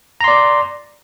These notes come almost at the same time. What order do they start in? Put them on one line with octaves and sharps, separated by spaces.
A#5 C6 D5